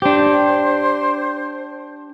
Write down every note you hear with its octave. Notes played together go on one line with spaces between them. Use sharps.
D4 G4 C5